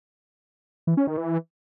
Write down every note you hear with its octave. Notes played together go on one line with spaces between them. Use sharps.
E3
C#4
D#3
E3